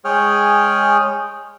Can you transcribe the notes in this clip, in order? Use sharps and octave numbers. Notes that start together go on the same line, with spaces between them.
G#3 G#4 C#5 G5 D#6 F6